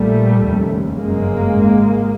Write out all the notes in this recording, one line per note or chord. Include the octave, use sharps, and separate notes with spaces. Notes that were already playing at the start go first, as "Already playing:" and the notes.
Already playing: A#1 A#2 G3 A3
F1 D#2 C#3
G1 F#2 C#3 G#3 A#3
G#1 G#2